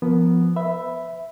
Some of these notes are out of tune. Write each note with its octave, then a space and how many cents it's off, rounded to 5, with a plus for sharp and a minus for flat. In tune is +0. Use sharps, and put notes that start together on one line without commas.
F3 -10 B3 +0 A#4 +0
B4 +40 E5 +0 B5 +0